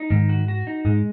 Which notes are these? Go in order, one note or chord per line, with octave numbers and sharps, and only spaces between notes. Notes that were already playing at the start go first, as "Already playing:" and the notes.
Already playing: D#4
G#2 D#3
F#4
F#4
D#4
G#2 G#3